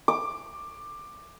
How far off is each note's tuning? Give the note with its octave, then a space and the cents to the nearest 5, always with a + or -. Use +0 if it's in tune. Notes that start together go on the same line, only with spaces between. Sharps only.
D6 +15